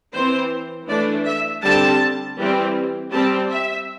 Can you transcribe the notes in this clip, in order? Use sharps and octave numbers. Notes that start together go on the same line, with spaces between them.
E3 C4 C5
E3 A3 D4 D5
E5
D3 G3 C4 A5
E3 G3 C4
G3 C4 A5
E5